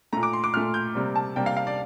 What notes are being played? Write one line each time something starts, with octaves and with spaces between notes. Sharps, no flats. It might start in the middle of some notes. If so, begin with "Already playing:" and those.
A#2 A3 A#5
D6
C6
D6
A#2 A3 F6
G6
C3 G3 A#3
A5
C3 G3 A#3 G5
F5
F5
D5